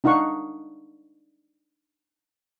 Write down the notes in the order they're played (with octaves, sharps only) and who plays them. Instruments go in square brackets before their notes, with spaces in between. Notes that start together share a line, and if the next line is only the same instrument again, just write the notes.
[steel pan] D4 D#4 F5 F#5 C#6